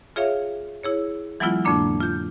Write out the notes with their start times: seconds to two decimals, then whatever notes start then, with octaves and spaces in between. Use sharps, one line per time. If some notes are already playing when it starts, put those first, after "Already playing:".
0.16 F4 G#4 C#5 E5 F5
0.83 E4 G#4 C#5
1.40 E3 F#3 G#3 B3 E4 F4
1.65 F2 A2 D3 A#3 D4 D6
2.00 F4 G6